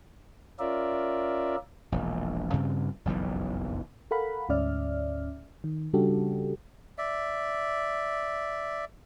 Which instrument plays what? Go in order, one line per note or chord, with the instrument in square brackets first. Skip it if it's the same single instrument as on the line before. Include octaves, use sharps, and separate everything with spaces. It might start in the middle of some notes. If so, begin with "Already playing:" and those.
[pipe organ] C#4 F4 A#4 D5 E5
[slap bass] E1 A#1
G2 C#3 C4
F#1 B1 F2 E3
[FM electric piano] A4 A#4 F5 F#5 B5
D2 G#2 C#4 D5 E5 F6
D#3
C#3 G3 D4 F#4 G4 A4
[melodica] D5 E5